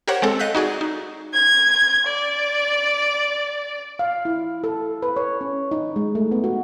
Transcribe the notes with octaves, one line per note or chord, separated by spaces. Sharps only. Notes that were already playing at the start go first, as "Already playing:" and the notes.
G4 A#4 C5 C#5 F#5
G#3 C4 A4
D#5 F5 F#6 G6 B6
D#4 F#4 G#4 D5
D#4
G#6
D5
F5
E4
A4
B4
C#5
C#4
D#4
G#3
A3
B3
F#4